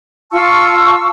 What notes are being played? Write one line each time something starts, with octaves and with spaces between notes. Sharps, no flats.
F4 A5 C#6 E6